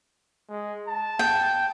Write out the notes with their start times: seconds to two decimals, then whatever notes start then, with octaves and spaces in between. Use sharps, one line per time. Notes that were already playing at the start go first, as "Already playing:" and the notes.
0.50 G#3
0.88 A5
1.19 G5